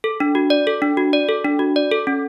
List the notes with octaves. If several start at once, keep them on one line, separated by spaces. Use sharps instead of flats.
A4
D4
F#4
D5
A4
D4
F#4
D5
A4
D4
F#4
D5
A4
C#4